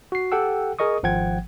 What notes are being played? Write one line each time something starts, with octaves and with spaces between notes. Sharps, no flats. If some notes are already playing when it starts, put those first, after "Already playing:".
F#4 C7
G4 A4 F#5 G5 E6
G#4 A#4 D#5 C#6 D#6
G#1 F3 F#5 G5 G#6